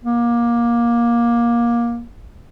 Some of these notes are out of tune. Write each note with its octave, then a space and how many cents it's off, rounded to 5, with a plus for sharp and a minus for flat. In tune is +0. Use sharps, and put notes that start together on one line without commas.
A#3 +20